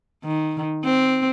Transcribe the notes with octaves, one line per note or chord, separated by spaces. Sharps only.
D#3
C4